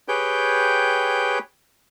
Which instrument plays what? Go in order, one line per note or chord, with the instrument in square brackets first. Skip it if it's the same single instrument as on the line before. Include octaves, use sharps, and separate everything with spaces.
[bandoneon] G4 G#4 B4 C#5 G5 G6